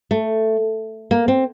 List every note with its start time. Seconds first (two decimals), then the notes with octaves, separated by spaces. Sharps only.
0.11 A3
1.11 A#3
1.28 C4